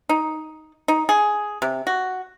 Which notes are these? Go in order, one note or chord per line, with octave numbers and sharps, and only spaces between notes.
D#4
D#4
G#4
C3
F#4